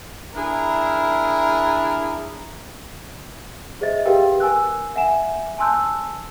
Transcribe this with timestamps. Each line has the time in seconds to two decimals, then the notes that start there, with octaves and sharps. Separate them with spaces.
0.35 D4 E4 G#4 A#4
3.81 G#4 C5 D#5 E5 A6
4.06 G4 G#4 A#4 B4 F5 G5
4.40 A#4 G#5 E6 F#6
4.96 E5 F#5 G#5 E7
5.58 G#5 A5 C6 E6 F#6 G6